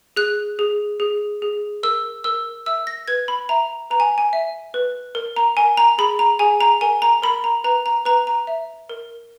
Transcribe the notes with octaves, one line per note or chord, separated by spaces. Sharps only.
G#4 F#6
G#4
G#4
G#4
A#4 E6
A#4 E6
E5 E6
A#6
B4 G#6
B5
E5 A#5
B4 A#5
G#5
G#5
E5
B4
A#4
A#5
A#4 G#5
A#5
G#4 B5
A#5
G#4 G#5
A#5
A#4 G#5
A#5
A#4 B5
A#5
B4 A#5
A#5
B4 A#5
A#5
E5
A#4